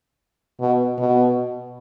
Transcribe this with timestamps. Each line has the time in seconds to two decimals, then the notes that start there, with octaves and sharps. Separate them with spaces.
0.60 B2
0.98 B2